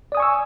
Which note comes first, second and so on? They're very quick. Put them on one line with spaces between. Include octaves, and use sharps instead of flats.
D5 D#6 G#5 C#6 E6